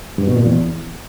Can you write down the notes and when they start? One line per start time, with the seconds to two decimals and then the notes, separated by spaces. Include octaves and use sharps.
0.18 G2
0.27 B2
0.36 A#2
0.45 E2